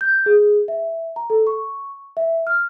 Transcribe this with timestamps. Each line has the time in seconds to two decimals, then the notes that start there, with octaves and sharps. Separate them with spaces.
0.01 G6
0.26 G#4
0.68 E5
1.16 A#5
1.30 A4
1.47 C#6
2.17 E5
2.47 F6